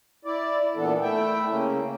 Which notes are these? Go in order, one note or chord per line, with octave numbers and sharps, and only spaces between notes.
E4 D5
A#2 E3 B3 D4 A4
A3 E4 E5 G5
C#3 A#3 C#4